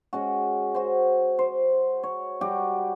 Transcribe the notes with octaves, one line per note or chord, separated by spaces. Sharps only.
G#3 C#4 F#4
F#4 C5
C5
C#5
G3 F#4 G4